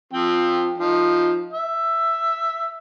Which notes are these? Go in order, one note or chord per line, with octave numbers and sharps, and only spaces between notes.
F3 C4 G5
F3 D#4
E5